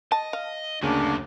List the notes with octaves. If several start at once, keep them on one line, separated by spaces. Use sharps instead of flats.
D#5 A5
F5
D2 C#3 A#3 D4 F#4 G#5
F#2